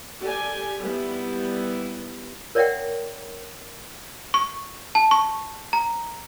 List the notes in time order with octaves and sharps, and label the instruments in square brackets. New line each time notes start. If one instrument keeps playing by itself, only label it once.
[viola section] G4 A4 D5 G#5
G3 B3 E4
[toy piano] A#4 C#5 D5 E5 F#5 G5
[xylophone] C#6
A5
C#6
A#5